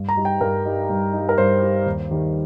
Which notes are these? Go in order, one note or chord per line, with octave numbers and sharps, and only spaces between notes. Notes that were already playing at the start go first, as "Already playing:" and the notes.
Already playing: G2
A#5
G3 D#4
G5
G2 A#4
G3 D#4
G2
G3 D#4
A#4
G2 C5
G3 D#4
D#2
D#3 G3 D#4